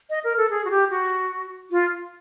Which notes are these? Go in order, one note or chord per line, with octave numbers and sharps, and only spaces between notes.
D#5
A#4
A4
G#4
F#4
G4
F#4
F4